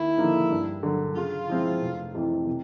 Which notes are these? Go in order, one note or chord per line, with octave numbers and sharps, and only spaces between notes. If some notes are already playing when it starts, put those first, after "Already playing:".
Already playing: D#2 E4
D3 F3 A#3 D#4
G2
D3 F#3
C#3 F4
F3 G#3 C4 E4
F1
F2 C3 E3
C3